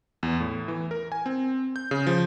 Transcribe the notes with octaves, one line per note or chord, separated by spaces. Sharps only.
E2
A2
E3
A#4
G#5
C4
G6
C#3
F3